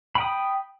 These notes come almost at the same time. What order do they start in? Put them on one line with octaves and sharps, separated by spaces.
B5 G5 D#6